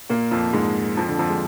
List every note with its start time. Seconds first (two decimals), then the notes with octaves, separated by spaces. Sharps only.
0.10 A#2 A#3
0.31 F2 F3
0.53 G#2 G#3
0.96 F2 F3
1.08 D3
1.18 F2 F3
1.29 G#3